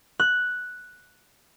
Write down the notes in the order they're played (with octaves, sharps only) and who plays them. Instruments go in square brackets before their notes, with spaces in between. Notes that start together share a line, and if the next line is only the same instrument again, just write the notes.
[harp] F#6